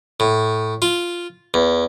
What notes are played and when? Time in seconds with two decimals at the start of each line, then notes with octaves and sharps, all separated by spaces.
0.20 A2
0.82 F4
1.54 E2